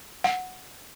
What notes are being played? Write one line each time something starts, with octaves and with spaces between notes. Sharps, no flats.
F#5